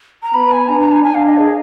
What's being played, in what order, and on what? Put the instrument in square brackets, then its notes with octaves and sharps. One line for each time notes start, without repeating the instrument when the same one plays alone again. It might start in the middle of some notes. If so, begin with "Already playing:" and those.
[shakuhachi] A#5
[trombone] B3 [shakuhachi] B5
[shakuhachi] G#5
[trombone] D4 [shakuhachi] A#5
[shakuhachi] A#5
G#5
[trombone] D4 [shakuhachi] G#5
[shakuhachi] F5
D#5
G#4